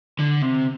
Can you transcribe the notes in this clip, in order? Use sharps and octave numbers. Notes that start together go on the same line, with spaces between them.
D3
C3